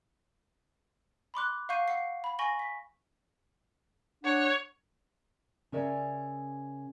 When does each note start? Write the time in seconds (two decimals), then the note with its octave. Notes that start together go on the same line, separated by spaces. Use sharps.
1.34 B5 C6 D6 F#6
1.69 F5 F#5 C#6 G6 C7 D#7
1.88 F#5 C7
2.24 B5
2.39 G#5 C#6 A#6 F#7 G7
2.59 B6
4.24 D4 C#5 F#5
5.72 C#3 C#4 A#4 D5 E5 G#5